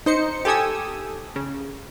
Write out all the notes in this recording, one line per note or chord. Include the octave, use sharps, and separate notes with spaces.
D#4 C5 C#7
G4 A4 G#5 D#6 E6
C#3